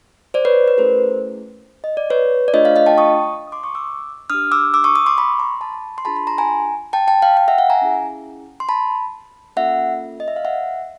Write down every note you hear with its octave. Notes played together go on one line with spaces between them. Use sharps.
C5 D5
B4 C#5
B4
A3 C#4 E4 G#4 A#4 C5
D#5
D5
B4 C#5
D5
A3 D4 F4 G#4 C#5 D#5
D#5 F5
D#5 F5
G5 A5
C#6 D#6
D#6
C6 D6
C#6 D#6
D6 E6
D4 G4 D#6 F6
D6 E6
D6 E6
C#6 D#6
C#6 D#6
C6 D6
B5 C#6
A#5 C6
A5 B5
C6
D4 F4 G#4 A5 B5
A5 B5
A#5 C6
G#5 A#5
G5 A5
G5 A5
F5 G5
F5 G5
E5 F#5
E5 F#5
G#5 A#5
C#4 E4 G#4
C6
A5 B5
A#3 C#4 F4 A4 E5 F#5
D#5
E5
F5
E5 F#5